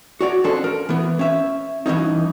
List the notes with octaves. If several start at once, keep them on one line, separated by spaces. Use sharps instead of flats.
F#4 C#5 D5
F2 C#4 D4 G#4 A4 C6
A#4
E3 B3
C#4 E5
G2 E3 A#3 C#4 D#4